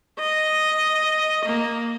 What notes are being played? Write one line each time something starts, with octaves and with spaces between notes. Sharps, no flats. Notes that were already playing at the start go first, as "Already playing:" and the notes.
D#5
A#3